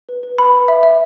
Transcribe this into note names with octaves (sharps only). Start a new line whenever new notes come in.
B4
B4
B4 B5
B4
E5
E5